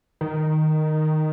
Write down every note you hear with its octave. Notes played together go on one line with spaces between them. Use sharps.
D#3